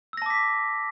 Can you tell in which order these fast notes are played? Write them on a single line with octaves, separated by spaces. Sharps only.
E6 A#6 A5 D6 B6